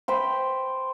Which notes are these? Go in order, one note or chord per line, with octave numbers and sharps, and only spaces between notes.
C5 G5 B5